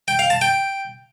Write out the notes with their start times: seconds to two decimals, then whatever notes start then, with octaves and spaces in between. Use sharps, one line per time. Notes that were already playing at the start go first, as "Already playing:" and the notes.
0.08 G5
0.19 F5
0.30 A5
0.41 G5